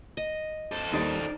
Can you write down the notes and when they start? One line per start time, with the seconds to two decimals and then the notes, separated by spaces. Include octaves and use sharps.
0.17 D#5
0.71 A4 C5
0.93 D#2 G3 D#4 D5